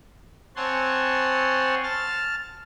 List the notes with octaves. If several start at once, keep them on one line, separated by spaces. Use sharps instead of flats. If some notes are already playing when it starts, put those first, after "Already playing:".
C4 C#5 F#5 G#5 A5 C6
A5 F6 A6